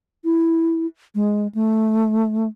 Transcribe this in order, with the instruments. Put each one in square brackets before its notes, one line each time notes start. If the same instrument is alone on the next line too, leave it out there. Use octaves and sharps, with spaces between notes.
[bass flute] E4
G#3
A3